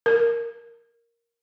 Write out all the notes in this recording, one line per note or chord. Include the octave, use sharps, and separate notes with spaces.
A#4